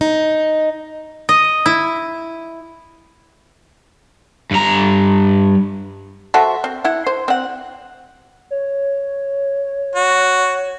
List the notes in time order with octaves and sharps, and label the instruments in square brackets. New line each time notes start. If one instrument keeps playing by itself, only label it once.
[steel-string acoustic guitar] D#4
[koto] D#5
E4
[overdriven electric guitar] G2 A#5
[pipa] F#4 A4 C5 E5
C4
E4 F#5
C5
C4 F#5
[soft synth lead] C#5
[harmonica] F#4